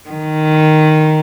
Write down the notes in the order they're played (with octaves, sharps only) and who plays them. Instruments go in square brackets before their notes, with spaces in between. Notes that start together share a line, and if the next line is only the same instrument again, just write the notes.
[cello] D#3